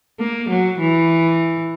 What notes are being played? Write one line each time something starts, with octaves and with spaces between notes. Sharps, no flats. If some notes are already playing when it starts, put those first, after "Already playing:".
A#3
F#3
E3